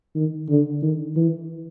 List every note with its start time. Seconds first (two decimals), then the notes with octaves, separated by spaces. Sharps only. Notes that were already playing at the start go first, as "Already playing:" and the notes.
0.15 D#3
0.49 D3
0.82 D#3
1.16 E3